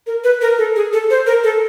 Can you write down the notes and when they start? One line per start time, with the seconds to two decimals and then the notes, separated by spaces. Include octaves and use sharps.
0.07 A#4
0.24 B4
0.41 A#4
0.58 A4
0.76 G#4
0.93 A4
1.10 C5
1.26 A#4
1.44 A4